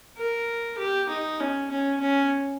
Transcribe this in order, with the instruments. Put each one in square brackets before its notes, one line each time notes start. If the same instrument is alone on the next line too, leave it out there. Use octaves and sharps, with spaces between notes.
[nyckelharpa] A#4
G4
D#4
C#4
C#4
C#4